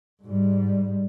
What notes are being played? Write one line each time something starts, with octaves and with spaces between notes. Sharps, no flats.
G#2 G3